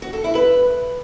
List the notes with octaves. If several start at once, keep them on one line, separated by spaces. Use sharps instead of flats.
F#4
A4
E4
B4